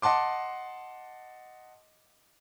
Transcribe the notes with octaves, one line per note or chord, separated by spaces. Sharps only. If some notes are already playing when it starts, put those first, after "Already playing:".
D#5 F#5 A5 C6 D6